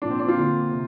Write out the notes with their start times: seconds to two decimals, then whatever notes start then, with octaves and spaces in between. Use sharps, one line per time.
0.02 A#2 F3 A#3 D4
0.10 C4
0.20 D4
0.27 C4 F4
0.37 D3 A#3
0.71 C3